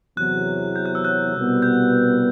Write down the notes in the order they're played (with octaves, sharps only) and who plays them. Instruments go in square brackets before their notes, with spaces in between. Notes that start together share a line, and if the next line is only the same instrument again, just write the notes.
[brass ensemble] E2 C3 F#3 [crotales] F#6
[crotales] G6
F#6
E6
F#6
[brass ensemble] C2 B2 G3 B3
[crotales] G6